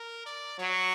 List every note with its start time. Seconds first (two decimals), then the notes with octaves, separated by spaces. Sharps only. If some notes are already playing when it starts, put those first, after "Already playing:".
Already playing: A#4
0.26 D5
0.59 F#3 C#5